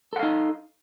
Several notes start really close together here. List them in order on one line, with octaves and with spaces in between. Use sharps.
A4 F#5 F5 D#4